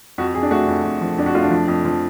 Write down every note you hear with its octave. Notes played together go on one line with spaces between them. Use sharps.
F2 F#4
F2 G#4
D4
A3 F#4
F2
F2
F3
F2 D4
F#4
A3 F4
D4
F3
F2
F3